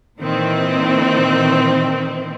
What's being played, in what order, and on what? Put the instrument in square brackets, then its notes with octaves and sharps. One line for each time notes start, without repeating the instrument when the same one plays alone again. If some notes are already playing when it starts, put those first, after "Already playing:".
[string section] A#2 D#3 E3 C4